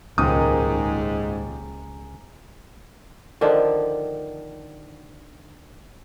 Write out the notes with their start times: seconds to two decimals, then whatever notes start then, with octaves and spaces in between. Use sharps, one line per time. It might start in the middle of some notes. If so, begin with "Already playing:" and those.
0.18 D#1 C#2 G#2 D#4 G#4 A#4 D#6
3.41 D3 D#3 F3 D4